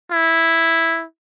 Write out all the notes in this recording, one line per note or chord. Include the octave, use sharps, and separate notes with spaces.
E4